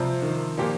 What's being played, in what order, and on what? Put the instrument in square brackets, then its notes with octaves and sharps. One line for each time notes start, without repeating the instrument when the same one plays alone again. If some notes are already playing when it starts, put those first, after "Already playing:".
Already playing: [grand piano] C3 G3 C4 [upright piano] F3
[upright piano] D#3
[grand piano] A#2 F3 A#3 G4